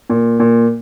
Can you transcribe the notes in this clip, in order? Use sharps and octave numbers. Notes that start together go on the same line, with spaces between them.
A#2
A#2